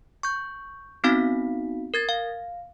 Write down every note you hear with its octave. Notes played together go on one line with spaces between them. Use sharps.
C#6 G6
B3 C4 D#4 F#4 F5 B6
A#4 G#6 A6
F5